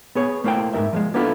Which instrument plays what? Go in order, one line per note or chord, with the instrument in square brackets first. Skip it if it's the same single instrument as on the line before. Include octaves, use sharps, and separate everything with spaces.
[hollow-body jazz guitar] B3 G#4 C#5
A3 A#3 E4 C5 G5
G#2 D#3 A#4 E5
F3 G3 G#3
A#3 B3 D4 E4 F4 A4